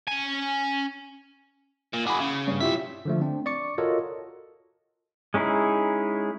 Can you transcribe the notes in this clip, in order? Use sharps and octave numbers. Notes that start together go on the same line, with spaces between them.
C#4 G#5
A#2
F#4 G#4 B5 D6
C#3
G2 C#5
B1 E4 F4 G4 E5
D3 F3 A3
C4 D4
D5 C#6 D6 C#7
F4 F#4 A4 A#4 C#5 D#5
G#3 C#4 D#4 E4 G#4